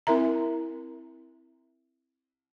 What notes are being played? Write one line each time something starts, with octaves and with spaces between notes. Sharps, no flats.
C4 E4 A#4 E5 A#5